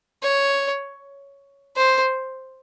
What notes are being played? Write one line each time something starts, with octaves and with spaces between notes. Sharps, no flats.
C#5
C5